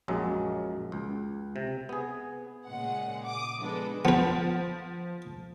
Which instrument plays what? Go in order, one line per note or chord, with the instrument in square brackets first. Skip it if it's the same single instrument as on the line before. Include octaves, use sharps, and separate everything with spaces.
[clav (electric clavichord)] A#1 F#2 F#3 G#3
C#2
C3
B3 G#4
[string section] A#2 C#3 G#3 F#5
D6 D#6
F3 G#3 B3 D4 A4 B4
[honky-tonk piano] F3 [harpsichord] B3 B4